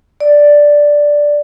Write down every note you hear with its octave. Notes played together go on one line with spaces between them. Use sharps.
D5